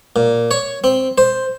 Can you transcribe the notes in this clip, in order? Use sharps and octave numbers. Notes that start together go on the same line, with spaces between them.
A#2
C#5
C4
C5